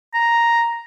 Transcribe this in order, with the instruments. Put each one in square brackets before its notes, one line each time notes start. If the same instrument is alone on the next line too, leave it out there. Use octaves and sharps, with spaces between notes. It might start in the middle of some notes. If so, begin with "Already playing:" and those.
[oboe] A#5